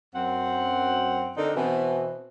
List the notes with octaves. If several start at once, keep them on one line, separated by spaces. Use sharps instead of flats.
F#2 C4 F#5
D3 C4 D4 D#4 A4 A#4
B2 E3 C4